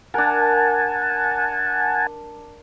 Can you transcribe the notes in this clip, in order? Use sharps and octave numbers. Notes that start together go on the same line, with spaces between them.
D4 A#4 F#5 G#5 A5